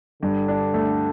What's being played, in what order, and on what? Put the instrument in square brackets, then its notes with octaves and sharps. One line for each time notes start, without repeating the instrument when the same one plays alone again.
[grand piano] G2 [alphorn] D3
[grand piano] D4
A3